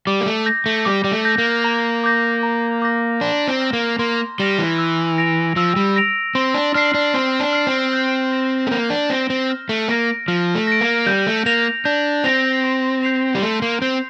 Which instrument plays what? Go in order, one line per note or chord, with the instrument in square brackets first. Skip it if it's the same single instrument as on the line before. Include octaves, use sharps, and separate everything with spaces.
[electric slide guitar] G3 [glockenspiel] D6
[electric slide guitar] A#3
A3
[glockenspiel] G6 A#6
[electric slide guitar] A3
[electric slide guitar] G3 [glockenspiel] D6
[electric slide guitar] G3
A3
[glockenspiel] G6 A#6
[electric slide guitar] A#3
[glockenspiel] A#5
D6 G6 A#6
A#5
D6 G6 A#6
[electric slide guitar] D4 [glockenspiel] C6
[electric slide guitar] C4
[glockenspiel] F6 A#6 E7 G7
[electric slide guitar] A#3
[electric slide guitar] A#3 [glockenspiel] C6
[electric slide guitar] G3 [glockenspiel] F6 A#6 E7 G7
[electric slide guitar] E3
[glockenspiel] E6
A#6 D7 F7
[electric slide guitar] F3 [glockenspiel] E6
[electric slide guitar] G3
[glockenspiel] A#6 D7 F7
[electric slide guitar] C4 [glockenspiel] C6
[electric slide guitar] D4
[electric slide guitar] D4 [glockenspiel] F6 C7
[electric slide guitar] D4
[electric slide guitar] C4 [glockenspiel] C6
[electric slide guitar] D4
[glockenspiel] F6 C7
[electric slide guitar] C4
[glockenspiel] G6
A#6 E7 G7
[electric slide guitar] A3
[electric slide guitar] A#3 [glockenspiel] G6
[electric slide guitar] D4
[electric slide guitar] C4 [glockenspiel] A#6 E7 G7
[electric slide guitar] C4
[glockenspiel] F6
[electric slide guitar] A3
[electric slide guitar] A#3 [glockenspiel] A#6 D7
[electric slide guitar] F3 [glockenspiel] F6
[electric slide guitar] A3
[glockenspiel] A#6 D7
[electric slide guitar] A#3
[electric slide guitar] G3 [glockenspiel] G6
[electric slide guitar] A3
[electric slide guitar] A#3 [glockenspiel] A#6 F7
[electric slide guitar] D4 [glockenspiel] G6
[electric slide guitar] C4 [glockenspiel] A#6 F7
[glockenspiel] C6
G6 C7 F7
[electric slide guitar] G3
[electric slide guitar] A3 [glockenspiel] C6
[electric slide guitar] A#3
[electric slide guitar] C4 [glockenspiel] G6 C7 F7